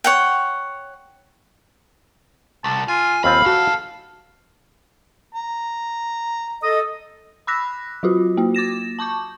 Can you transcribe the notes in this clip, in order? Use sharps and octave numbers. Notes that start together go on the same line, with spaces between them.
C#5 F#5 G5
C2 A5
F4 G#5
D#2 C4 F4 F5 B5
E2 F#4 A4 F#5
A#5
A4 D#5
B5 D6 E6 F#6 A#6 B6
F#3 F4 F#4
A#3 F#4
D6 A6 A#6 E7
A5 C#6 D6 G6